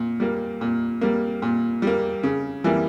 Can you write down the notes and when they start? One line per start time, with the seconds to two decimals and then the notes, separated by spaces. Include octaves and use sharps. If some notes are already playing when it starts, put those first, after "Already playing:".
Already playing: A#2
0.20 G3 A#3
0.61 A#2
1.01 G3 A#3
1.42 A#2
1.82 G3 A#3
2.23 C#3
2.64 E3 G3 A#3